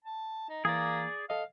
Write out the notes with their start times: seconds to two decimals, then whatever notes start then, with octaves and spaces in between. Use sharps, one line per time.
0.04 A5
0.49 D#4
0.65 E3 A#3 G#4 D5
1.30 A4 D#5 F5